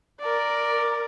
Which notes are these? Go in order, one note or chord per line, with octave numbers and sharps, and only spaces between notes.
A#4 D5